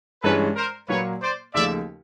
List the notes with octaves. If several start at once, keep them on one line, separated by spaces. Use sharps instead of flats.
G2 E3 G#3 C#4 A4 B4
A#4 C5
A#2 F#3 A#3 B4 C#5
C5 D5
D#2 C#3 F3 A3 D5 E5